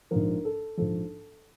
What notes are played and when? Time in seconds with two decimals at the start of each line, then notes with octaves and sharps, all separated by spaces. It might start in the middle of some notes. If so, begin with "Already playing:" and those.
0.11 A#1 G#2 F3 A#4
0.45 A4
0.77 A#1 G#2 F3 A4